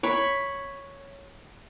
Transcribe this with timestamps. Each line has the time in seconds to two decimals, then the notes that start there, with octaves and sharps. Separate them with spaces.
0.03 C#5 B5